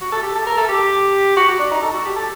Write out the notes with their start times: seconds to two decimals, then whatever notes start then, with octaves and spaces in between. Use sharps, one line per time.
0.01 F#4
0.13 A4
0.23 G4
0.35 A4
0.47 A#4
0.58 A4
0.69 G4
1.37 F#4
1.49 F#4
1.59 D4
1.71 D#4
1.82 A4
1.94 F#4
2.05 G4
2.16 A4